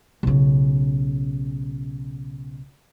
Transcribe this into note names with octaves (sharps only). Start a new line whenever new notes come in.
B1 C#3